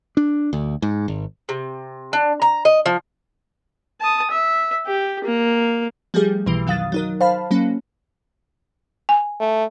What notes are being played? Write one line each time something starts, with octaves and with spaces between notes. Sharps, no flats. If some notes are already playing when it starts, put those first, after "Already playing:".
D4
D2
G#2
G#1
C3
D4
A#5
D#5
F3
A5 D#6
E5
G4
A#3
F3 G3 A3 G4 G#4
B1 B2 E3
F2 D#3 F#3 F5 D#6 A6
F#3 D#4 A#4
C5 F5 A5 B5
F#3 A#3 C#4
G#5
A3